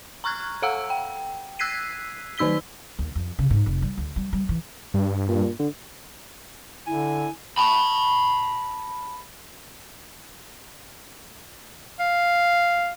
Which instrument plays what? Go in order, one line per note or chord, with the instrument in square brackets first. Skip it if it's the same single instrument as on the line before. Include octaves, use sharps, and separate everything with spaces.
[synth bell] A#5 C#6 F6 F#6 G#6
A4 F5 F#5 A#5 E6
G5
E6 F#6 G#6 B6 C7 D#7
D#3 F#3 D#4 E6 B6 G7
[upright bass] D#2
F2
C#3
G#2
F1
G3
D2
G3
G3
E3
[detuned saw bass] G2
[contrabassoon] A#2
D3
[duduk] D3 [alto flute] E4 [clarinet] G#5
[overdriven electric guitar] A5 B5
[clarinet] F5